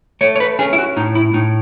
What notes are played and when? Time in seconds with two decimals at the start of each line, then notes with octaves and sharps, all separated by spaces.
0.21 A3 C#5
0.36 C#5
0.40 B4
0.59 C#4 G#4
0.73 E4
0.78 F#4
0.97 A2 D#4
1.15 E4
1.34 A2 D#4